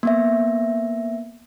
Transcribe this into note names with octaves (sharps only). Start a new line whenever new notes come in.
A#3 B3 E5